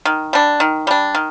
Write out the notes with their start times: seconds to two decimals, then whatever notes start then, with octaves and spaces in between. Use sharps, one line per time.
0.05 D#3
0.33 G3 D4
0.60 D#3
0.87 G3 D4
1.15 D#3